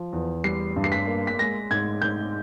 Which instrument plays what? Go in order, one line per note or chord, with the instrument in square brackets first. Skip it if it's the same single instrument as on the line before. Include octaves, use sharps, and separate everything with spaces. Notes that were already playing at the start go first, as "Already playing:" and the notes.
Already playing: [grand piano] F3
E2
[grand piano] G3 [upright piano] C7
[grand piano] G2
[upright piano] C7
B6
[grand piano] A#3
[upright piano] B6
[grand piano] G#3 [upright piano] A#6
[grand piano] G#2 [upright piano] G#6
[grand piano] G#2 [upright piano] G6